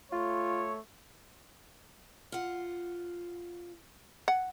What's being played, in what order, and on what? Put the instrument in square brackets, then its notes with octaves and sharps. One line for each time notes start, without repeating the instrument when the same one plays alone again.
[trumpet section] A3 C#5 [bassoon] F4
[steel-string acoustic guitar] F4 F#5
[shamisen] F#5